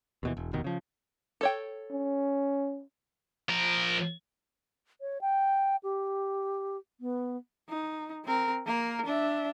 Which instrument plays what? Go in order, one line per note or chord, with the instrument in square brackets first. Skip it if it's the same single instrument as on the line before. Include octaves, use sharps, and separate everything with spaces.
[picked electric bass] D#2 B2 E3
E1
F1 D#2 B2 D#3
C#3 F3
[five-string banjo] A4 C#5 G5
[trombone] C#4
[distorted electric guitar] F3 A#4
[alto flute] C#5
G5
G4
B3
[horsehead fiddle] D#4
C4 A#4
A#3 A#4
D4 E5